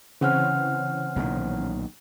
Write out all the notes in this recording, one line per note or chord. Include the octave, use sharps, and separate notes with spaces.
C#3 E3 C4 C#4 C5 F#5 F6
B1 A#2 D#3